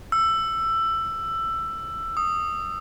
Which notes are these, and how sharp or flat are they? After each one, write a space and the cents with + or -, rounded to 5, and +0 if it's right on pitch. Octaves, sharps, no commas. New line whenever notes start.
E6 +15
D#6 -10